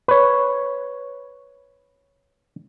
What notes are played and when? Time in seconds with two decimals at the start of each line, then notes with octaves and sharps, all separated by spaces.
0.08 B4 C#5